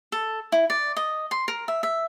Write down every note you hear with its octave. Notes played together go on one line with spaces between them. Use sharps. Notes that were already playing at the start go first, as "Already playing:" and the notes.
A4
E4
D5
D#5
C6
A#4
E5
E5